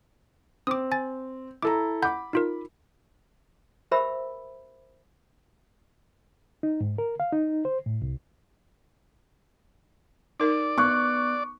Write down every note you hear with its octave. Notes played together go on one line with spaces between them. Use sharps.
C4 D6 D#6
G#5 A6
E4 A4 A#5 D6
F#5 B5 D6 G6
D#4 F4 A#4
G4 A#4 C5 E5 B5 E6
D#4
G#2
A#4
F5
D#4
C5
A2
C2
D#4 A#4 D5
B3 C#6 D6 F#6